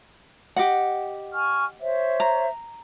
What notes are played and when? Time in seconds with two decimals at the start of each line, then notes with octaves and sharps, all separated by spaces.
0.56 G4 D#5 F#5
1.34 G#5 C#6 F6
1.81 C5 C#5 E5
2.20 A#5